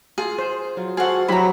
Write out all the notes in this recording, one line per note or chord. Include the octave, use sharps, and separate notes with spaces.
F4 G#4
C5
F#3 F4
C4 F#4 G#4 A4 F5 F#5
F#3 E4 G4 C5 A#5 B5